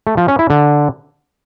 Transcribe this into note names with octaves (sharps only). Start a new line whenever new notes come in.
A3
F3
C#4
E4
D3